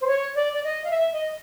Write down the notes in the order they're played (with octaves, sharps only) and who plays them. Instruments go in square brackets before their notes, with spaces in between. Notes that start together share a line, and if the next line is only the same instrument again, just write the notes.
[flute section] C5
C#5
D5
D5
D#5
F5
E5
D#5